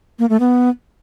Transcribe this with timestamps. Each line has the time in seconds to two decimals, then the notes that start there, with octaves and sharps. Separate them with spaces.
0.19 A#3
0.29 A3
0.40 B3